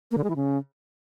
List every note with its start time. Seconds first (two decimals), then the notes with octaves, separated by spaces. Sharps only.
0.11 A#3
0.17 D3
0.24 G#3
0.30 E3
0.36 C#3